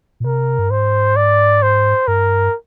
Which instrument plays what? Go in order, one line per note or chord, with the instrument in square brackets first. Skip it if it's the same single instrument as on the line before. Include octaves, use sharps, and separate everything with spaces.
[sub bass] A#2
[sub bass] C3 [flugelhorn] A#4
[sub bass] G2
[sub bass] G#2 [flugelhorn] C5
[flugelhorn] D5
C5
[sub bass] G2 [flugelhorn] A#4